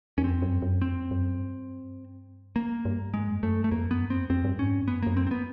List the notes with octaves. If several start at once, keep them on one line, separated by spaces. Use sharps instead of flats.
E2 C#4
F2 C4
F#2
F#2
F2 C4
F#2
G2
A#3
G2
G#2 G#3
F#2
F#2 A3
G2
A3
F2 A#3
F#2 B3
G2
C4
F2
F2 C4
G2
G#2 C#4
G2
F#2 B3
F#2 A#3
C4
C4
B3